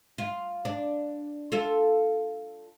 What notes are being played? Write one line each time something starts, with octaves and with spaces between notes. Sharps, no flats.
F4
D4
F4 A4